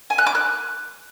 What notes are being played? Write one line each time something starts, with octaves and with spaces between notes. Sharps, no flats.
G#5
F#6
D6
F#6